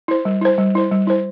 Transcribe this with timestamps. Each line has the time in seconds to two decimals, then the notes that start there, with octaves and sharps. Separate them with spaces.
0.08 E4 C5
0.25 G3
0.41 E4 C5
0.58 G3
0.75 E4 C5
0.91 G3
1.07 E4 C5